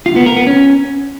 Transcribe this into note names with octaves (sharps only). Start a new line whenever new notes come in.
F4
B3
A#4
B3
C#4